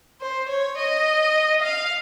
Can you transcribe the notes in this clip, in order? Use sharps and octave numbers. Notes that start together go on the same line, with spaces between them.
C5
C#5
D#5
F5